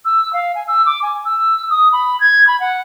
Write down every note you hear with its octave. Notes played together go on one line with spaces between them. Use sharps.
E6
F5
G#5
E6
D6
G#5
E6
D#6
B5
G#6
B5
F#5